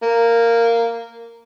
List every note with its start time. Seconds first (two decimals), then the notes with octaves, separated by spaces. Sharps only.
0.03 A#3